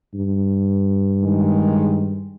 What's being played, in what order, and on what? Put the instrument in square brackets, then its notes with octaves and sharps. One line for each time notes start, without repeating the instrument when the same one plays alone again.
[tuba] G2
[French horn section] D#3 G#3